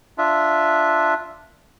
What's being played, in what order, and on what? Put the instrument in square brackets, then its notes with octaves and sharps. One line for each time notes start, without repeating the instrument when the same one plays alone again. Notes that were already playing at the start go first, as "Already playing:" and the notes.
[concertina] D4 F4 E5